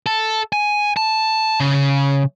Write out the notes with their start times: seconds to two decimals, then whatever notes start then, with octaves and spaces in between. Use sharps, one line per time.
0.06 A4
0.53 G#5
0.97 A5
1.60 C#3